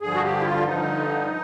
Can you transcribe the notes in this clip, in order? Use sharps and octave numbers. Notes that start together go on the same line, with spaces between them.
G2 D3 F3 G#4
F#4
G4
E4
F4
G2 D3 F3 D#4